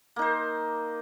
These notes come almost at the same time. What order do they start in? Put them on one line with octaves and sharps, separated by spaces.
A#3 D#4 C5